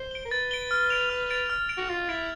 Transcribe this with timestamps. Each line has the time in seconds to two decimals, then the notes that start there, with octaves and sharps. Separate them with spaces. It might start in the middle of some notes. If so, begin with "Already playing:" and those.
Already playing: C5
0.11 D7 G7
0.25 A#4
0.31 B4 A6
0.51 D7 G7
0.71 F6
0.90 A6 D7 F7
1.10 F6
1.30 A6 D7 F7
1.50 F6
1.69 A6 D7 F7
1.77 F#4
1.89 F4 F6
2.09 E4 A6 D7 F7